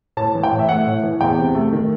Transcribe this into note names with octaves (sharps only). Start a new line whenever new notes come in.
A2 A5
E3
G5
A2
E5
A3 F#5
A2
E3
E2 G5
C3
A3
D#3